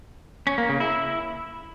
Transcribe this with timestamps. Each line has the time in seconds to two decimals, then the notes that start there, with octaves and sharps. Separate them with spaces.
0.47 C#4
0.58 A#3
0.69 C#3
0.80 E4